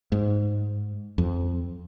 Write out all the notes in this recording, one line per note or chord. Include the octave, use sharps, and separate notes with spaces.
G#2
F2